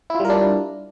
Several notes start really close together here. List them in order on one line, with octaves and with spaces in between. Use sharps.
E4 F4 G3 A#4 D4